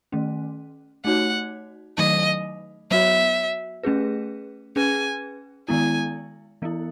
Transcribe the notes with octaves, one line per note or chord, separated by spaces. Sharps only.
D#3 A3 C#4
A3 D#4 F#4 C#5 F#5
D#3 F#3 A3 D#4 D#5
F#3 B3 F#4 C#5 E5
A3 C#4 G#4 B4
C#4 G#4 B4 G#5
D#3 G#3 B3 E4 G#5
E3 B3 E4